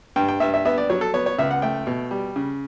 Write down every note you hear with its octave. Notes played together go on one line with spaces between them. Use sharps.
G2 G5
G5
G2 E5
E5
B3 E5
D5
F#3 C#5
A4
B3 C#5
C#5
C#2 E5
F#5
A3 G5
B2
G3
C#3